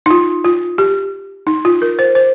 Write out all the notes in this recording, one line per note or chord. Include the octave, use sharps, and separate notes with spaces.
D#4
F4
F4
G4
D#4
F4
A#4
C5
C5